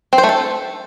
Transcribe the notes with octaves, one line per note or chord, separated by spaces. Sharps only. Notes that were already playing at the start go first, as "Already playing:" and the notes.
C4
C5
A3
A4